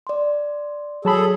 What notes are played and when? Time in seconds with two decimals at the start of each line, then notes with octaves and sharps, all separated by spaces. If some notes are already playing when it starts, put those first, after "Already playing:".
0.07 D5 C6
1.05 F#3 G#4 A4 A5 B5